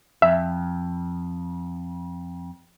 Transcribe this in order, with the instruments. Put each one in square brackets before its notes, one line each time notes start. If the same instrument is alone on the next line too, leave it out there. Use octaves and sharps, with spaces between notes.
[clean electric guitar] F2 [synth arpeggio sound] E5